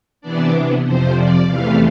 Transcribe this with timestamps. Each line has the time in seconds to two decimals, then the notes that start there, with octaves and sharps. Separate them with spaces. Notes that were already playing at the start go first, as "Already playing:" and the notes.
0.21 C3 E3 B3 D4 D5
0.84 F2 C3 F3 C5
1.15 D5
1.47 E2 C3 E3 A3 F5